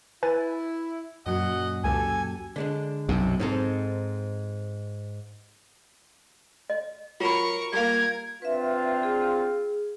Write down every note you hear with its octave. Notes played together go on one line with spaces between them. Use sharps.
E4 B4 G#5 A6
F#2 A#2 F#3 D#5 F#5
C#2 B2 G4 A4 G#5
D3 G#3 D4
B1 F#2 C3
G#2 C4 D#4 A4
D#5
F#3 F4 A#4 B5 C#6
G3 A#3 A#4 G#6
C4 D4 F4 B4 E5
G#4